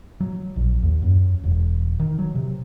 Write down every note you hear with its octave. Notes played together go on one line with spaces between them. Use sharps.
F#3
A#1
D#2
F#2
E1
D#3
F#3
C3